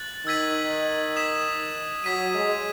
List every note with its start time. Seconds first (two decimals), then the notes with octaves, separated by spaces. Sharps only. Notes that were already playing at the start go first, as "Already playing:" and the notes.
Already playing: F#6 A6 F#7
0.26 D#3 E6 G#6 B6 D#7 F#7
1.16 D#6 G#6 B6 E7
2.04 F#3 D#6 G#6 B6 D#7
2.34 G#3